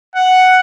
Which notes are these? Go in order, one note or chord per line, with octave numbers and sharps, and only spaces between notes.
F#5